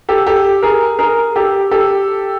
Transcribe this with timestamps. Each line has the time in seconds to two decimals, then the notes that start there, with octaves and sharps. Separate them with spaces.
0.09 G4 A4
0.27 G4 A4
0.62 G#4 A#4
0.99 G#4 A#4
1.36 G4 A4
1.71 G4 A4